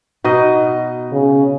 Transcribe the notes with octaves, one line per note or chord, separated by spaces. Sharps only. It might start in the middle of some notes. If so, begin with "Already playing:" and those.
B2 D#4 D#5
C#3